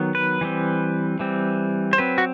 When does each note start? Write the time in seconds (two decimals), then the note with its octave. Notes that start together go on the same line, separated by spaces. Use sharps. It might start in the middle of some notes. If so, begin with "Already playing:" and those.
Already playing: D#3 F#3 B3
0.15 B4
0.41 E3 G3 C4
1.19 E3 G3 C4
1.93 C5
1.98 F#3 C4 B4
2.18 F#4